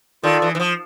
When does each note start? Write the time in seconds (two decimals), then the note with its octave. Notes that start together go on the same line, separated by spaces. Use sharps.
0.24 D#3 F4 A4 D5
0.42 E3
0.55 E3
0.60 F3